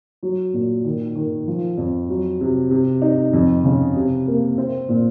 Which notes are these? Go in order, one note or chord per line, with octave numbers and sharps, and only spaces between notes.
F#3
A#2
D#3
D#3
F3
F2
F#3
C3
C3
D#4
F2
C#3
C3
A#3
C4
A#2